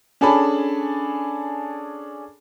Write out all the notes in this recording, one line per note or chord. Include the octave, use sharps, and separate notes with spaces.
C#4 D4 G#4 A4 A5 B5